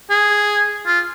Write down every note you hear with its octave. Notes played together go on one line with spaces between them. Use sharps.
G#4
F4